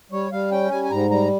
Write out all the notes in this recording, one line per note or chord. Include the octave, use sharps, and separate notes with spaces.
G3 C#5
G3 F5
C#4 G5
G3 G#5
G#5
G#2 A#5
G3 A#5